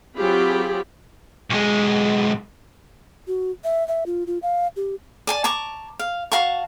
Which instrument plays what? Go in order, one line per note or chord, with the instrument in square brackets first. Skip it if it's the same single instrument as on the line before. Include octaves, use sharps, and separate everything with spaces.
[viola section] F#3 C4 F4 G4 G#4 B5
[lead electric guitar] B1 G#3
[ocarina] F#4
E5
E5
F4
F4
F5
G4
[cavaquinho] D5 G#5 A5
A5 A#5 C#6 D6
F5
F#4 F5 A5 C#6